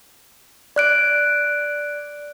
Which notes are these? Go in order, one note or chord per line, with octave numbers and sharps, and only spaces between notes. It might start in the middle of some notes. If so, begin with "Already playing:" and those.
D5 F#6 D7